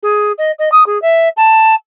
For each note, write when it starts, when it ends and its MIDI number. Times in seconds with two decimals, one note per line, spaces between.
0.02 0.32 68
0.38 0.51 75
0.58 0.69 75
0.72 0.83 87
0.86 1.00 68
1.02 1.28 76
1.36 1.75 81